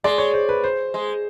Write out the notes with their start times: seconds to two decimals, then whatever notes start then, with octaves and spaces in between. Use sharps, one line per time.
0.04 G#3 D5
0.18 C#5
0.34 C5
0.49 B4
0.64 C5
0.94 G#3